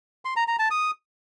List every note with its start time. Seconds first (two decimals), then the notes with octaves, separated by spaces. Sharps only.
0.25 C6
0.36 A#5
0.48 A#5
0.59 A5
0.71 D#6